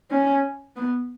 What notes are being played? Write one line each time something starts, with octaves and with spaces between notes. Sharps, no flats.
C#4
B3